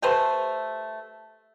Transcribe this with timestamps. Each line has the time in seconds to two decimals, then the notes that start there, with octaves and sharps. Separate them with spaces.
0.02 A3 G4 B4 C5